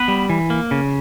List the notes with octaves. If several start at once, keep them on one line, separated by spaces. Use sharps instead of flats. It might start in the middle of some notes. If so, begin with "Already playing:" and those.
Already playing: B3 B4
G3
E3
A#3
C#3